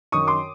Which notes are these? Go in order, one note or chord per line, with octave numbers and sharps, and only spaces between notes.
F#2 D#3 C#6 D#6
C6 D6